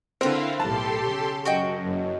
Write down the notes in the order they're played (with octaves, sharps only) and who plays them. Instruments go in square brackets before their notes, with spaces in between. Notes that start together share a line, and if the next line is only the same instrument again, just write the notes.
[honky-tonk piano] D3 C4 [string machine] E4 F5 [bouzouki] A#4 B4
[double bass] B1 A2 [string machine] G4 A4 C6 [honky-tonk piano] A5
[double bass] C#3
[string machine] F#2 [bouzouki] F#4 D#5 G5
[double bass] F#1